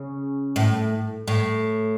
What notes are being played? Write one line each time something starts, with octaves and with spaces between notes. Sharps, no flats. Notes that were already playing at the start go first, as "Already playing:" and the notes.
Already playing: C#3
A2
A2